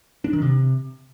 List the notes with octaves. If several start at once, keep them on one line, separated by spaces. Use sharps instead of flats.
D4
D#3
C3